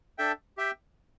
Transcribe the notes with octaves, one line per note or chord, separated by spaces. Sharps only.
D4 A4 E5 G5
G4 E5 G5